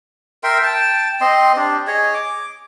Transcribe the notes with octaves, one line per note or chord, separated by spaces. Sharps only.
A#4 E5 G5 C6
G5 A5
C4 D#5 C6
D4 G4
G#4 C#5 D#5
D6